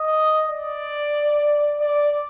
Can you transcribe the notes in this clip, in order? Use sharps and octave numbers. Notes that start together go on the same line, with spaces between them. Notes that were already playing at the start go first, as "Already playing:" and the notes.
Already playing: D#5
D5
D5